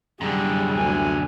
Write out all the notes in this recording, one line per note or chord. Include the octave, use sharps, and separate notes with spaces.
F#2 D3 G3 G#4
D2 G#5